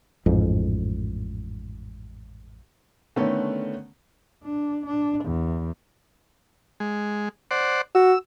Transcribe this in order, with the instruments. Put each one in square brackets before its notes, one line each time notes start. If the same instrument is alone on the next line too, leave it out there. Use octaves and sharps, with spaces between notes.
[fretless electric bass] A1 F2 G#2
[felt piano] D3 D#3 A3 B3 C#4
[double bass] D4
D4
E2
[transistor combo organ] G#3
C5 D5 F#5
[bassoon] F#4 [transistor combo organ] E6